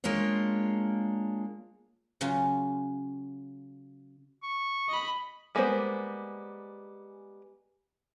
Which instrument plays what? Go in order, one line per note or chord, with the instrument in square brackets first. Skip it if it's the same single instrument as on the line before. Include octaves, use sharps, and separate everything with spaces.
[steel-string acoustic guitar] G#3 A#3 D4 F4 C#5
[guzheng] C#3 F#3 C#4 F4
[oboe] C#6
[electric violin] D#5 B5
[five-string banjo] G3 G#3 A#3 B3 C5